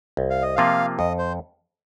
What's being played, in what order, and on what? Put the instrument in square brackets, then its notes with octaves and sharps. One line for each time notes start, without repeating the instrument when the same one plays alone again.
[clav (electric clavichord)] C2
[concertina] F5
D#5
[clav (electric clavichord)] C3 F3 A#3 F4 [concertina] F5
[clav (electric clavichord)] F2 [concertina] D#5
[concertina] C5